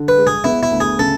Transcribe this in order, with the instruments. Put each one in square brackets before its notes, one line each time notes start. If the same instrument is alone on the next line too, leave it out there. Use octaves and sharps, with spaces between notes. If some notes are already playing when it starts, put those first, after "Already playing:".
Already playing: [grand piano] D3
[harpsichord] B4
[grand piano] G#3
[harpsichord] G#4
[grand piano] B3 [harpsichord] E4
[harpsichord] E4
[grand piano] D2
[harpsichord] G#4
[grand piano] C#3 [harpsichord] A4